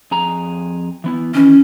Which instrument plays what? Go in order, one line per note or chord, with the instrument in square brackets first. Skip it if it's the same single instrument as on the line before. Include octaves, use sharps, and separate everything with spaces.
[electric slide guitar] F2 G#4 A#5
E3 B3 E4
[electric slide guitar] D#3 E3 [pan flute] C#4